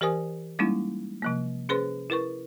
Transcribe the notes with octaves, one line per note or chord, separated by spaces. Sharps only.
E3 G4 A#4 C5 G#5 D#6
G3 G#3 A#3 C#4 D#4 E4
C3 F3 A#3
C#4 G#4 B4 C5 C6
E4 A#4 B4 C#6